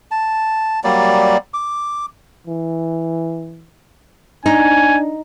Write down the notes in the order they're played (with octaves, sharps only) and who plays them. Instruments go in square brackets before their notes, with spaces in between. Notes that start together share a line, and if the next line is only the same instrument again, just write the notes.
[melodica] A5
F#3 G3 A#3 D5
D6
[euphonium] E3
[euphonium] D4 [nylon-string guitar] D#4 [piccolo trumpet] G#5